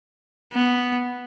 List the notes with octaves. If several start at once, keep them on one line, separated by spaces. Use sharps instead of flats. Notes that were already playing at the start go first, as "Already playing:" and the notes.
B3